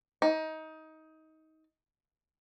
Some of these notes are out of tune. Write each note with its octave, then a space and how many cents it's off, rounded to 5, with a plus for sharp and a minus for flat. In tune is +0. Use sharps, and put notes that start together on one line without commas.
D#4 +20